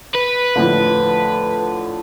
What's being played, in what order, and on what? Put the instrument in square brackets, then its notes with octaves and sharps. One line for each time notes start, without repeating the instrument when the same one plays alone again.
[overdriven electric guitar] B4
[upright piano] F2 A2 D3